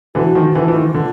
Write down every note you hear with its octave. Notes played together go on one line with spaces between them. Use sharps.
D3 E3 F#4
D#3 F3
D3 E3
E3 F4
D#3
D3